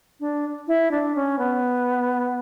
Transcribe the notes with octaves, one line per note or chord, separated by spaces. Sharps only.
D4
E4
D4
C#4
B3